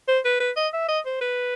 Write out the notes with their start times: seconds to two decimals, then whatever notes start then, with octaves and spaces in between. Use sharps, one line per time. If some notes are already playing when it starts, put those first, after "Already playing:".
0.08 C5
0.25 B4
0.40 B4
0.57 D#5
0.73 E5
0.88 D#5
1.06 C5
1.21 B4